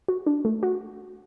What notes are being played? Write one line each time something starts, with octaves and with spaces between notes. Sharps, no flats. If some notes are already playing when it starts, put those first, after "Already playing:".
F#4
D4
A3
F#4